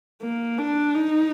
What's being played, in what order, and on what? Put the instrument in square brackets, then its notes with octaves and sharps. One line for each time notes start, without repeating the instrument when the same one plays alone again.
[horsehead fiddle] A#3
D4
D#4